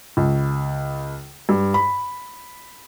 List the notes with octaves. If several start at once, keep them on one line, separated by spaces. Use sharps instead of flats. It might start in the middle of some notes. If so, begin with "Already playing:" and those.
C#2
G2
B5